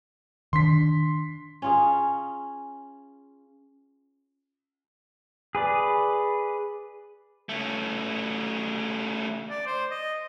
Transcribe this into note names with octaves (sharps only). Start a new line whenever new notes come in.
D#3 D4 C6 B6
C#4 F4 G#4
G#4 B4 D5
C#3 A3
D5
C5
D#5